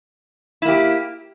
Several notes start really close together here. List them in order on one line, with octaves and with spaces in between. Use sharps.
E4 A#3 G4